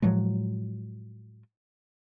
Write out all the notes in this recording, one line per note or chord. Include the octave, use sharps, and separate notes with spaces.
A2 F3 F#3 G#3